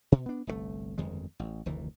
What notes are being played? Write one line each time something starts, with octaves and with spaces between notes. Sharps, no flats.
B2
B3 D4
G1 C2 C#3 A3
G1 F2 D#3 G#3
A1
F1 D2 D#3 E3